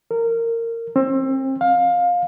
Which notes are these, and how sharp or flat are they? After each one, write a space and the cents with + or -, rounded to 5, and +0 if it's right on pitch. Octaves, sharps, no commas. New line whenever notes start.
A#4 -20
C4 +30
F5 +20